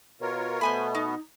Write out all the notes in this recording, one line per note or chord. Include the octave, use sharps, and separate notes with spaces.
B2 F4 A#4 C#5
B2 A3 B3 C5 G#5 B5
D#4